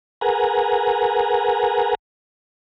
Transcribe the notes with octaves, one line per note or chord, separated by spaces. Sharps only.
G#4 A#4 B4 F#5 G#5 A#5